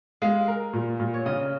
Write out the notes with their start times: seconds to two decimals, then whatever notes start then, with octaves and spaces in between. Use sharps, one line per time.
0.22 G#3 F5
0.48 A#4
0.73 A#2
1.00 A#2
1.14 C#5
1.26 C#3 D#5